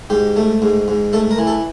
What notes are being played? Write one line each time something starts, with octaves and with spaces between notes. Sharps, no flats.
G#2 G4
A3
G#2
G#2
A3 A4
A#4
E3
A4